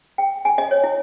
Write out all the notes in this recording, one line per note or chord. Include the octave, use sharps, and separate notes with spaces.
G5
G#5
D#5
C#5
E4